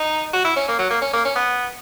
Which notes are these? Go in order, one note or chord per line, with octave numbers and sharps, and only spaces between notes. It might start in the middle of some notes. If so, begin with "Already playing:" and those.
Already playing: D#4
F#4
E4
C#4
A#3
F#3
A#3
C#4
A#3
C#4
B3